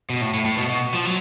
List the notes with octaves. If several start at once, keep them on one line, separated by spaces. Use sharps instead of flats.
B2
A2
A2
A2
B2
B2
F3
F#3